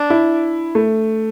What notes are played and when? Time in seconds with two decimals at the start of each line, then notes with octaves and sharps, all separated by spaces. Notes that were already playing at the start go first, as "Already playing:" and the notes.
Already playing: D4
0.10 E4
0.75 A3